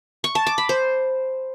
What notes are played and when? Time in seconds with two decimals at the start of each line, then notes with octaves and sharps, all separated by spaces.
0.24 C#6
0.35 A5
0.47 D6
0.58 B5
0.69 C5